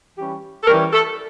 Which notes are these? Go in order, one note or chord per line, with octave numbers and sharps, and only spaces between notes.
E3 G3 C#4 G4
A4
E3 G3 C#4 A#4
A4